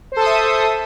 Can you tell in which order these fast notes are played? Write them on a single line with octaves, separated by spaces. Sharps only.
C5 A4 D#6 E5